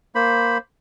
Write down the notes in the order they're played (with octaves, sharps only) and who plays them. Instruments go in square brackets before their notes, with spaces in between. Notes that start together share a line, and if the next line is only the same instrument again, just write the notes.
[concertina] A#3 C5 B5